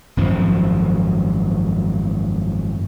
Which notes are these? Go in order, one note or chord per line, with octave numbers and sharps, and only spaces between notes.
G#1 F#2 F3